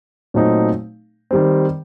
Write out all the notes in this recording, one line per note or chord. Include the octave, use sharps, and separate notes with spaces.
A#2 F#3 A3 C4 D#4
D#3 G3 C4